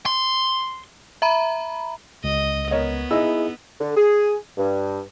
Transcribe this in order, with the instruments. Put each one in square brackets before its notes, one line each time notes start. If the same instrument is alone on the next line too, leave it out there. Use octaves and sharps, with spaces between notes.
[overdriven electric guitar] C6
[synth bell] E5 A#5 B5
[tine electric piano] C#2 [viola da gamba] D#5
[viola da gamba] B3 [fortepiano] A#4 C#5 D#5
[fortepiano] D#4 E6 [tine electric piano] E4 G#4 D#5
[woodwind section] D3
G#4
G2